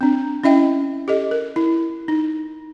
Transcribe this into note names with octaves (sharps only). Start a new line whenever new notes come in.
C4 D4
C#4 E4 D#5 E5 G5
G4 A4 D#5
A#4
E4
D#4